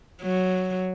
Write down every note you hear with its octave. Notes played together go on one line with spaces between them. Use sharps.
F#3